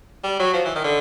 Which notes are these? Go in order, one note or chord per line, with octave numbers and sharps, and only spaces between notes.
G3
F#3
F3
E3
D#3
D3